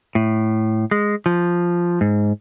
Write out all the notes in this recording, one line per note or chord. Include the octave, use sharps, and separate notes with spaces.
A2
G#3
F3
G#2